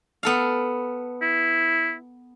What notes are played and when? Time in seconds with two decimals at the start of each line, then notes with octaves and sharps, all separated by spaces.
0.23 B3 A4 F5
1.22 E4